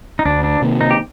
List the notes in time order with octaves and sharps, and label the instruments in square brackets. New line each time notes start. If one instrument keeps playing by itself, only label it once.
[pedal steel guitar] D#4
[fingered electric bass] D2 [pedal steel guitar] D4
[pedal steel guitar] D4
[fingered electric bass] C3 D#3 A#3
[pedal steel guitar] D#4
G4